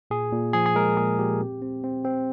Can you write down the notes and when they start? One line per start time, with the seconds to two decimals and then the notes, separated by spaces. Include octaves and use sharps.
0.11 A#2 G#4
0.32 A#2
0.53 F3 G#4
0.66 G#4
0.75 G#3 A#4
0.97 A#2 G#4
1.19 A#2 G4
1.40 C4
1.62 C4
1.84 C4
2.05 C4